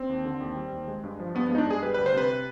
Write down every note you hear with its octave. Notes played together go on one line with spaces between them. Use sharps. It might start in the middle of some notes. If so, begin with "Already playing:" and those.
Already playing: C4
D#2
D3
D#2
G3
D#2
G#3
G2
F3
G2 B3
B3
G#3 D#4
D4
G2 G#4
G3 B4
B4
D2
C5
C3 B4